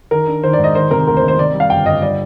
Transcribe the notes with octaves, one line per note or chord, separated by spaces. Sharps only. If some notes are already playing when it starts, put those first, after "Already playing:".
D#3 A#4
D4
D#3 C5
D5
G#2
D#5
D#3 C5
C3 A#4
D2 A#4
C5
D#3
C5
C3 D5
G3
F5
G1 G5
G1 D#5
G3 D5